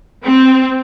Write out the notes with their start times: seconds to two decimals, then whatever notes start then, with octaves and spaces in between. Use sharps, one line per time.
0.25 C4